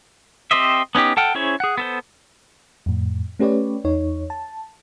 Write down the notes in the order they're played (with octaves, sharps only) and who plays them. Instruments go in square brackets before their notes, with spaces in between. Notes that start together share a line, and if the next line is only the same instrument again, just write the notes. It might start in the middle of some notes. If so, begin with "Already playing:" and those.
[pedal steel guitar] C4 G4 C5 D#5 E5
B3 C#4 D#4 G4
A4 F#5 G5 F6
C#4 E4 G#4 C5 C#5
G#4 F#5
B3 A4 C5
[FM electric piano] F2 A2
A3 C#4 G4 B4 C#5 D5
E2 D#4 C#5
A5